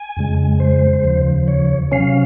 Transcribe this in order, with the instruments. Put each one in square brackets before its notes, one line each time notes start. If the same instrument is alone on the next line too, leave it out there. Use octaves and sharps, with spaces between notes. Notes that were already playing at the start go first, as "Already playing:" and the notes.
Already playing: [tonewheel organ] G#5
F2 C#3 G#3
C5
D#2 C#3 F3
C#5
C3 F#3 C#4 F5